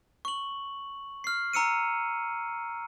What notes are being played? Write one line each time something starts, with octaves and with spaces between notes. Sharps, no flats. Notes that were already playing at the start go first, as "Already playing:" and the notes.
C#6 F#7
F6 C7
A#5 E6 C#7 D#7